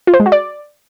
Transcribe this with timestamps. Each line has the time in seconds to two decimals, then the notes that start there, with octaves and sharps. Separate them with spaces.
0.07 F4
0.14 C5
0.20 G#3
0.26 F#4
0.32 D5